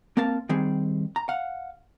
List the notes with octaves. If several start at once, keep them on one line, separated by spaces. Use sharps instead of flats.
A#3 C4 A#4 F5 A5
D#3 G3 C4 G#4
A#5
F5 F#5